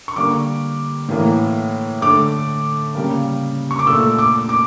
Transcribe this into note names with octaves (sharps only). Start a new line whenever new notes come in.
C#6
D3 G3 A#3 D6
A2 E3 A#3
D3 A3 D6
C#3 G3 A#3
C#6
D6
A#2 A3 E6
D6
D6